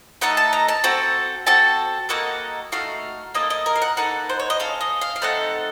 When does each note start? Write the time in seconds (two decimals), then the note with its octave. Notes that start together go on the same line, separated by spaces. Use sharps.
0.21 A3 D#4 A4 F#5
0.37 A5
0.53 A#5
0.68 A5
0.84 C4 F#4 A4
1.47 C4 F#4 A4 A5
2.09 A#3 D#4 F#4 A4 F#5
2.72 A3 D#4 F#4 F5
3.35 A#3 D#4 A4 D#5
3.50 D#5
3.66 A#4
3.76 F5
3.82 F#5
3.97 A#3 D#4 A4 F#5
4.29 C5
4.40 C#5
4.50 D#5
4.60 C#4 A4 F5
4.81 D#5
5.01 F5
5.16 F5
5.22 A3 C4 D#4 A4 F#5